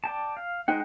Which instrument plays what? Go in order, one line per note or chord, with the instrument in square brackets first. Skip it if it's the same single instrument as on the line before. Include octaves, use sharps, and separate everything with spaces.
[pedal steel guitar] D5 G5 A5
F5
[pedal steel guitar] G#3 C5 F#5 [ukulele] D#4 G5